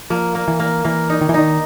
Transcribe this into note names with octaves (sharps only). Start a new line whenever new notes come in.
F3 A#3
A#3
E3
A#3
E3 A#3
D#4
D#3
E3
D#3 D#4